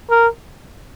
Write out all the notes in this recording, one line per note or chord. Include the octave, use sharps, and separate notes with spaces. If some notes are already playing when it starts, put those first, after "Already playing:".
A#4